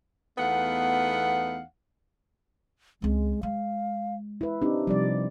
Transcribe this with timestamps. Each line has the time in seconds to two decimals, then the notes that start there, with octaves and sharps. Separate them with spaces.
0.38 E2 A3 B3 D#4 F5 F#5
3.02 C#2 G#3 C4
3.43 G#3 F5
4.41 E4 B4
4.62 C4 D4 D#4 G4
4.87 C3 F3 G3 D5